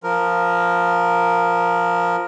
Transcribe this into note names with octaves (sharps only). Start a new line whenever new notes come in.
F3 A#4